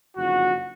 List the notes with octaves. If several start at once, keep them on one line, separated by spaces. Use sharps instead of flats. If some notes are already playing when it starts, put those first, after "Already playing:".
F#1 F2 D3 F#4